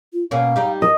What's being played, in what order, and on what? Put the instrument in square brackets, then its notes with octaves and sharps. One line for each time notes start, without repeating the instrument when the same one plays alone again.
[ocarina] F4
[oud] B2 A#3 C#4 [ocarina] F5
[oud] G3 D#4 G4
[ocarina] A#4 [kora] D#5